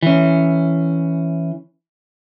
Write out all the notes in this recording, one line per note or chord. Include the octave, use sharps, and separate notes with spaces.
E3 C#4